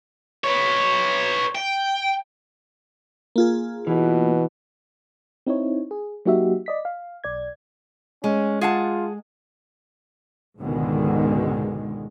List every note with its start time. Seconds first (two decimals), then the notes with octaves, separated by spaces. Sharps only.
0.44 B4 C#5
1.55 G5
3.36 A#3 F4 G#4
3.87 B2 E3
5.47 C4 D#4 E4 C#5
5.91 G#4
6.26 F#3 A#3 D#4 F#4 G4 E5
6.66 D5 D#5 B6
6.85 F5
7.24 B1 D5 G#6
8.24 G#3 C#4
8.61 F4 G#4 F#5 A5
10.59 C#2 G#2 B2 D3 D#3 G#3